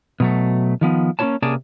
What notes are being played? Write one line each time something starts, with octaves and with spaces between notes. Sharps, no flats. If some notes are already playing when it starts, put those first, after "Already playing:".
B2 F#3 A3
D#3 F3 B3
A#3 C#4 E4 F#4 C#5 A5
C3 A#3 C#4 G#4 D5 A5